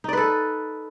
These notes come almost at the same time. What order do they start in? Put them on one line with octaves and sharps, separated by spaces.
D#4 D5 B4 A4